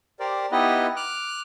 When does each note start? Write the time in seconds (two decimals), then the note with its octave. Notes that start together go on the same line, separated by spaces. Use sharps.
0.20 G4 A#4 C5 D5
0.52 B3 D#4 E4 G4 B4 D#5
0.96 D6 F6 F#6